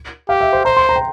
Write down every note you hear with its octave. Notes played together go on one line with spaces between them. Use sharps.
G4 F5
E5
C5
C5 A#5
C6
A#5
G5